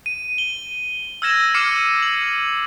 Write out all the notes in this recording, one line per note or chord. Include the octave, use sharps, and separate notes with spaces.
D#7
G7
E6 F6 G#6 A#6 E7
D6 F6 C7 C#7 D#7 E7
F#7